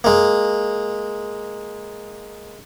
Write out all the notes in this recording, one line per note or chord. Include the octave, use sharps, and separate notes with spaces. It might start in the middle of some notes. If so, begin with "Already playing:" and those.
G#3 A#3